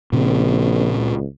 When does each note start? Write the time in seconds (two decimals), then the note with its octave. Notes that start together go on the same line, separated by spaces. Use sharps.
0.13 A#1 A#2 C#3 C4
0.96 C#2